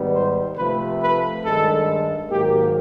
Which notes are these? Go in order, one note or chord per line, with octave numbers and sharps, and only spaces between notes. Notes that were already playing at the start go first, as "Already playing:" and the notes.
Already playing: G#2 D#3 G3 B3
C5
C3 F3 A3 B4
B4
G2 D#3 G#3 A4
G#2 D#3 F#3 A#3 G4